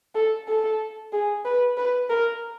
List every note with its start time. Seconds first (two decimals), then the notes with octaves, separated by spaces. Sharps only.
0.15 A4
0.48 A4
1.13 G#4
1.45 B4
1.77 B4
2.10 A#4